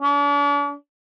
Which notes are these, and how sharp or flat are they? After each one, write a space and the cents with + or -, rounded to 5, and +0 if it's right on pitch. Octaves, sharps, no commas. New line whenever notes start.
D4 -45